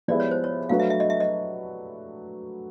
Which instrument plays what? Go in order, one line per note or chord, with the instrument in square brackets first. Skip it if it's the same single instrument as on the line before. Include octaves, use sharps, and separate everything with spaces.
[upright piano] F3 G#3 B3 E4 G4 [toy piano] D5
[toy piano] C#5
C5
C#5
[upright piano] F#3 A3 D4 F#4 B4 [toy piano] F5
[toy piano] E5
E5
D#5
E5
D#5